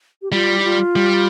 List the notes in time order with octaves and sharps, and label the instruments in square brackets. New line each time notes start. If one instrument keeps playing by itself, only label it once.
[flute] G4
[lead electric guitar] G3 [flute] F4
[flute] E4
F4
[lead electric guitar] G3